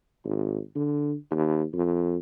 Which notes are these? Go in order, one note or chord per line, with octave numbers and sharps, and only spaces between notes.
G#1
D3
D#2
F2